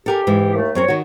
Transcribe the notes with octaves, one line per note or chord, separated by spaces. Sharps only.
G4 A4 A#4 G#5
G#2 E3
D#2 A3
F#2 C4 A#4 C#5
D#3 F#4